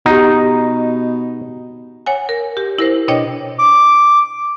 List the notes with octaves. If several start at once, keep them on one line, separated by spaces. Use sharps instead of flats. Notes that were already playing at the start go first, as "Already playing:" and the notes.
B2 D#4 G4 F#5
C#5 F#5 G#5
A#4
G4
E4 A#4 C5
B2 D4 C#5 D#5 G5 D6
D6